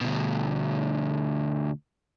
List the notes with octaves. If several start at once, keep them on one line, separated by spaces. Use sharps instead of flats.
D2 B2